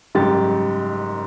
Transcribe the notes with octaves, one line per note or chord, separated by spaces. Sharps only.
F#1 G#2 G3 G4 A6